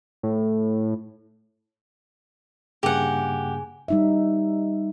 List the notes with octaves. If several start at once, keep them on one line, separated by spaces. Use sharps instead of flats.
A2
G2 C#3 A#3 G4 G#4 F#5 G#5
G3 D#4 E5